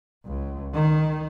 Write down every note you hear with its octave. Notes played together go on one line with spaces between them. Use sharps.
C#2
D#3